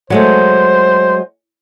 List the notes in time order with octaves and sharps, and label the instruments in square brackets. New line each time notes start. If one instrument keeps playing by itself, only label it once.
[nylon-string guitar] F#3 G#3 A3 [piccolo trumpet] C5